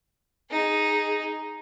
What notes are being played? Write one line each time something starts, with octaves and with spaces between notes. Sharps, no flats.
D#4 G#4